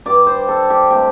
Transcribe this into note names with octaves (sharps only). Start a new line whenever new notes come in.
G2 G3 D5
C5
A4
G4
C3 A3 G4